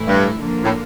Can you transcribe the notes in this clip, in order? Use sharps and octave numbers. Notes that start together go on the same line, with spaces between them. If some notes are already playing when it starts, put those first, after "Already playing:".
Already playing: A2 E3 A3 E4
G2
D3 F3 A#3 D4
A2